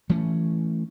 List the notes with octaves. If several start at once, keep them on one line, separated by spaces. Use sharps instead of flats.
E3 A3 C#4